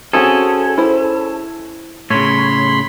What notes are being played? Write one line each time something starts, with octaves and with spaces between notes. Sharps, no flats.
C4 C#4 F#4 G#4 A4
E4 C5
A2 C#3 C#5 B5 C6